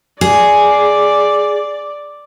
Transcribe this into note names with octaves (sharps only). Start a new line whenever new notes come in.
G#4 D5